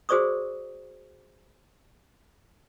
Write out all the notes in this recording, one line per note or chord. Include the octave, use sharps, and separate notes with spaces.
F#4 G#4 C5 D5 C#6 D#6